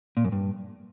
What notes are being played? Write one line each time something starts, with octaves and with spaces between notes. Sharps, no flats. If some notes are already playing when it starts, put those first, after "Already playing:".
A#2
F#2
G2